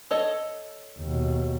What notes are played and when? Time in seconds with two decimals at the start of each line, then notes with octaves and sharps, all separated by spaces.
0.11 A4 C#5 D#5
0.99 D#2 B2